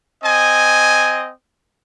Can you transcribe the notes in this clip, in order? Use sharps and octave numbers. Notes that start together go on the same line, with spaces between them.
C4 D#5 G#5